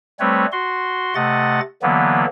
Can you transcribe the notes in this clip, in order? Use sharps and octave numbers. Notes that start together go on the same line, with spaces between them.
G3 A3 C4 B4 C#5
F#4 C6
C3 A3 D#5 F#5 A6
D3 E3 F#3 A#3 B3